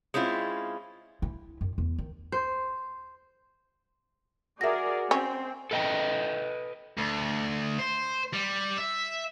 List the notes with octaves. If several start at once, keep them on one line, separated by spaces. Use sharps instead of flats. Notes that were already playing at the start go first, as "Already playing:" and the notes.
G#3 C4 C#4 E4 F4
E4
F#2
E2
D#3
C5
F#4 G#4 A#4 D5 E5 A#6
C4 C#4
A4 B4 D#5 F#5 G5
D2
C5
G3
E5